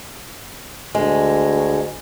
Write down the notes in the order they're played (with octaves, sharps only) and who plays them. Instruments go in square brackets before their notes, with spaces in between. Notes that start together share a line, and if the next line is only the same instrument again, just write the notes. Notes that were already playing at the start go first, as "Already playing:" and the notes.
[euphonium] D2 [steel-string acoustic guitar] G#3